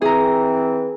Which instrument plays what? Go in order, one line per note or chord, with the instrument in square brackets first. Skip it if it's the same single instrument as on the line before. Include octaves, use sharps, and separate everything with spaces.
[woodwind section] E3 C4 [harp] G#4 A#5